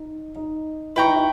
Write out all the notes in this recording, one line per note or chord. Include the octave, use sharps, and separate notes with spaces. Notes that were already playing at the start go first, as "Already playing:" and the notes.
Already playing: D#4
D#4
E4 B4 G5 A#5 C#6
D#4
E4